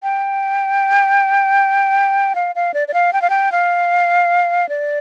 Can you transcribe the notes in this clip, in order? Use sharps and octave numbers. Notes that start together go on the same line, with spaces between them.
G5
F5
F5
D5
D5
F5
G5
F5
G5
F5
D5